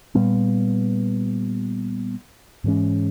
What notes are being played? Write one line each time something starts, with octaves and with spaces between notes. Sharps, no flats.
A#2 G3 B3
G#2 E3 G#3 C#4